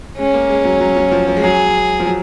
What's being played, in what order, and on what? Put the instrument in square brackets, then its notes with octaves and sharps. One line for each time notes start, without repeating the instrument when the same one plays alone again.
[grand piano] G#3 [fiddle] C#4
[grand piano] A#3
G#3
F#3
F#3
F#3
F3
F3
G#3
[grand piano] F#3 [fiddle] G#4
[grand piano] F3
F#3